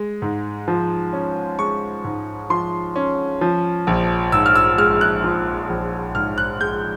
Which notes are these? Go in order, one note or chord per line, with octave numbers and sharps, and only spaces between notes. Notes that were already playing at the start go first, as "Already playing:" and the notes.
Already playing: G#3
G#2
F3
C#4
G#3 C#6
G#2
F3 C6
C#4
F3
A#1
G#2 E6
F6
E6
G#3 F6
F#6
F3
A#1
G#2 F6
F#6
G#3 G6